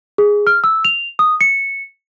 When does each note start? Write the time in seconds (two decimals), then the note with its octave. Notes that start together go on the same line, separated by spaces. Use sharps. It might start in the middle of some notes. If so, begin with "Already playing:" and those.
0.18 G#4
0.47 F6
0.64 E6
0.85 F7
1.19 D#6
1.41 C#7